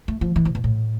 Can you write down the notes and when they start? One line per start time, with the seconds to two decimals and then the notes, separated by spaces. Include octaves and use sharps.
0.08 A3
0.21 F3
0.36 E3
0.45 C3
0.55 B2
0.64 A2